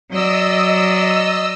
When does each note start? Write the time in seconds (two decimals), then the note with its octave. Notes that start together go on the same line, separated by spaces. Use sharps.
0.10 F#3 D5 D#5 E6